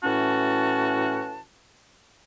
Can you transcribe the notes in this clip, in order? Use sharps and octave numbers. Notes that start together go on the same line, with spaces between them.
A2 E3 C#4 F#4 A5